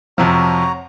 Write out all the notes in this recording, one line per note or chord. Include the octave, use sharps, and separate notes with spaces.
F2 C3 F3 F#4 C#5 A#5